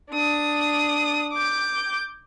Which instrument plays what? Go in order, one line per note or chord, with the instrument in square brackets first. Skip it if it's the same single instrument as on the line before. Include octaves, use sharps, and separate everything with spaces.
[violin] D4 D#6
D6 G6